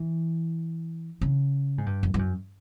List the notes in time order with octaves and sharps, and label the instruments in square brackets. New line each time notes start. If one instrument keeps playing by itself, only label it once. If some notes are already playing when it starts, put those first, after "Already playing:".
Already playing: [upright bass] E3
C#3
G#2
G2
F#2
G2
F#2